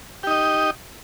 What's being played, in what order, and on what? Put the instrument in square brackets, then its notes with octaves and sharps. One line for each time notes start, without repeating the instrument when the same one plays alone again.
[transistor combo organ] G4
D#4
D#5